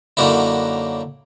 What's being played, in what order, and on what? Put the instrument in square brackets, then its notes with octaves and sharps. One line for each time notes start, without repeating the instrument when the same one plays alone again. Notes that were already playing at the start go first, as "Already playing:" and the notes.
[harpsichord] F#2 D3 F#3 A#3 D#4 E4